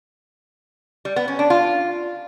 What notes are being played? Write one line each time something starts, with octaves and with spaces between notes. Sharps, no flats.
G3
B3
C#4
D4
F4